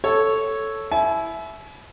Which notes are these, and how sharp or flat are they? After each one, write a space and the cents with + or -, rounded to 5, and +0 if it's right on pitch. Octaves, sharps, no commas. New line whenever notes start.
A4 +0 C#5 +0
E4 +0 G#5 +45